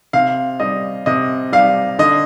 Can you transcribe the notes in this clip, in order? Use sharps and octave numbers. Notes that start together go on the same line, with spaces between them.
C3 F5
G3 D#5
C3 D#5
G3 F5
D3 D#5